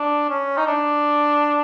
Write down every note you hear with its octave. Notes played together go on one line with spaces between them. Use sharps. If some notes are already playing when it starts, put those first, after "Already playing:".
Already playing: D4
C#4
D#4
D4